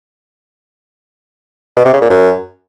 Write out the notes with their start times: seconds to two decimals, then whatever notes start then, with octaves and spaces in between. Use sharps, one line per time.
1.76 B2
1.85 C3
1.93 C#3
2.01 A#2
2.10 F#2